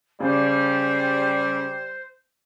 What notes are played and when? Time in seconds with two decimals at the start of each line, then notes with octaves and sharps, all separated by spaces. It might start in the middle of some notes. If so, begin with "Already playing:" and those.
0.20 C#3 G3 C5